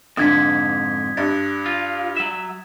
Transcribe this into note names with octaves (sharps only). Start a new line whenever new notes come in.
F2 G#2 D3 D#6 G#6 B6
G2 A6
F4
F#3 E5